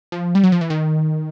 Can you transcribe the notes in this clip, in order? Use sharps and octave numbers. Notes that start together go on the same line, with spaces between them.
F3
G3
F#3
F3
E3
D#3